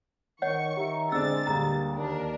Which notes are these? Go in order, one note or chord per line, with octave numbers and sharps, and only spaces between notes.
D#3 C#5 D#5 F#5 C#6
D#3 G4 E5 A#5
D3 G#3 C4 D4 E6 A6
D2 G3 G#3 A#3 G4 A#5
D#2 D4 A#4